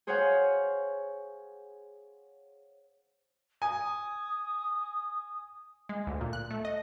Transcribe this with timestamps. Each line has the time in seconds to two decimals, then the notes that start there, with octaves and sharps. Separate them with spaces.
0.07 G#4 C5 C#5 F5 F#5 G#5
3.62 G#5 D#6
5.89 G#3
6.07 D2
6.21 A#2
6.33 F#6
6.50 A3
6.65 D#5